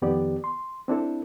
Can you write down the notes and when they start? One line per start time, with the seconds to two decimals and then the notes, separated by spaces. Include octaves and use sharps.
0.02 F2 D#3 B3 G4 D5
0.44 C6
0.88 C4 D4 E4 A4